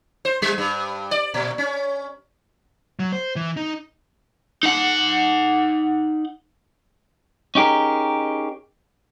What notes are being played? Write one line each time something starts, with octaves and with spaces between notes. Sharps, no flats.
C5
G3
G2
D5
A#2
C#4
F#3
C5
E3
D#4
D#4 F#5
C#4 D#4 G4 G#4 A#4